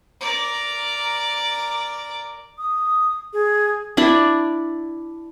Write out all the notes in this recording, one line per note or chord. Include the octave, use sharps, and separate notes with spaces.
A#4 D5
D#6
G#4
D4 E4 D5